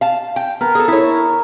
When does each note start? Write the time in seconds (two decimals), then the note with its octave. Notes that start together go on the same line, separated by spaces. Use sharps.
0.01 F5 A5
0.36 G5
0.61 B3 A#4
0.75 G#4 A4
0.88 E4 C#5